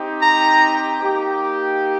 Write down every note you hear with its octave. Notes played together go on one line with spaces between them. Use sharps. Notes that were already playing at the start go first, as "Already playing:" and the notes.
Already playing: C4 D#4 G4
A#5
A#3 D#4 G4